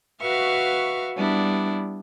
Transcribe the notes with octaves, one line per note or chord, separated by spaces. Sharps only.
F#4 B4 E5 F5 C#6
G3 B3 D4 E4